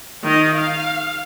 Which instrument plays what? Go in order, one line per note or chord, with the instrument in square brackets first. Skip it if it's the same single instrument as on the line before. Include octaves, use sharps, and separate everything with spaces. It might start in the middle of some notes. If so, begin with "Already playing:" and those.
[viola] D#3 D#5
F5